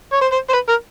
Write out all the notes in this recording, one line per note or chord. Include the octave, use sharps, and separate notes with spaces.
C#5
C5
C5
C5
B4
A#4